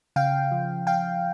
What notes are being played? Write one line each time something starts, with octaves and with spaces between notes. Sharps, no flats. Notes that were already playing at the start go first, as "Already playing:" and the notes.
C#3 F5 G5
F3
F5 G5